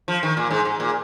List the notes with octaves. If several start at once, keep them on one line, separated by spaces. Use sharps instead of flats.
F3
D#3
A#2
G#2
G#2
A#2